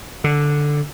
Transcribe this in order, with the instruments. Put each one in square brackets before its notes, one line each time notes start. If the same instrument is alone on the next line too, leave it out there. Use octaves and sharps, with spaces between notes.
[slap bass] D3